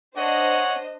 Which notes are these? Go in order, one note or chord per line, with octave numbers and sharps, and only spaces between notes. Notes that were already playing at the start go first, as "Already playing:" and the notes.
D4 C5 C#5 D#5 F#5